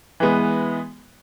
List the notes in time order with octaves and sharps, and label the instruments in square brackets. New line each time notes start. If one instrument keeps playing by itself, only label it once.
[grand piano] E3 G#3 B3